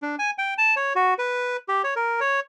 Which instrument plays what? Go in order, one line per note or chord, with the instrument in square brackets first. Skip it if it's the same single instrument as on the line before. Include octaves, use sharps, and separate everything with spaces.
[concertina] D4
G#5
G5
A5
C#5
F#4
B4
G4
C#5
A#4
C#5